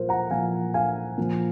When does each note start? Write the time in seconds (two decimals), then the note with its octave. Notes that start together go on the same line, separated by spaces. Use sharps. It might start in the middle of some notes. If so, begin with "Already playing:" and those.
Already playing: A#2 F3 A#4 C5
0.09 F#5 A#5
0.30 A#2 F3 F5 G#5
0.74 F5 G#5
1.17 A#2 F3